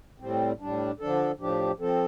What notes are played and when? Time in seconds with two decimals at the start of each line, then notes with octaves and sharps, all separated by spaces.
0.20 A2 G3 C4
0.60 A2 G3 D4
1.00 D3 F3 D4 A4
1.39 A2 F3 D4 G4
1.79 F3 C4 A4